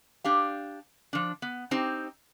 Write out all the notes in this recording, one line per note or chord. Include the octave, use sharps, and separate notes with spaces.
D4 G4 F5
F3 D4
B3
C4 D#4 G4 C5